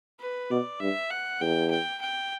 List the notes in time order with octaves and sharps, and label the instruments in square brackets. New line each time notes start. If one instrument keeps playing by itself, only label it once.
[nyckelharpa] B4
[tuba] B2 [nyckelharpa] D5
[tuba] G2 [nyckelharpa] E5
[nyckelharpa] F#5
[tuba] E2 [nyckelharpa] G5
[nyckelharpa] G5
G5